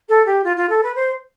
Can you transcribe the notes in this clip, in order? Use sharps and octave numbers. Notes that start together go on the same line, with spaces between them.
A4
G4
F4
F4
A4
B4
C5